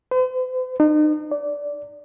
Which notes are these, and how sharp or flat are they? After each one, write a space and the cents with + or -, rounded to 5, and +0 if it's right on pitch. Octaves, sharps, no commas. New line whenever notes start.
C5 -45
D#4 -40
D5 -15